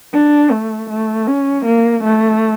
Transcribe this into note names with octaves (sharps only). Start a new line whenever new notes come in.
D4
A3
A3
C#4
A#3
A3